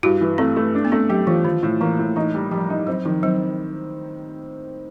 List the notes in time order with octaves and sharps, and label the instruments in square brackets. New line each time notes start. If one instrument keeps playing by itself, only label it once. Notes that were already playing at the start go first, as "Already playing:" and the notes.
[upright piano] G2 [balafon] E4 F#4
[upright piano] E3
[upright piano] A3 [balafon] C4
[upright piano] A3
D4
[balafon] B3
[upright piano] A3 [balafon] C4
[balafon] F#3 [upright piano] G4
[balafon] E3 [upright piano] F3
[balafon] D#3 [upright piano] F3
[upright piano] A2
[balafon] E3 [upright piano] A#3
[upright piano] A2
[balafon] E3 [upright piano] D#4
[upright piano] G3
[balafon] F3 [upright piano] G3
[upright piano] D#4
[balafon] F#3 [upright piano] C4
[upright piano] D#3 [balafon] F3
[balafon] F#3 [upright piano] C4